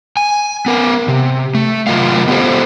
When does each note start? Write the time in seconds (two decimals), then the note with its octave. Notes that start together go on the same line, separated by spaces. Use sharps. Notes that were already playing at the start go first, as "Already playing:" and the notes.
0.17 G#5
0.66 B3 A#4
1.08 C3
1.55 A3
1.87 C3 F#3 F4 A#4 D#5 F5
2.28 B3 F4 G4 A4 C5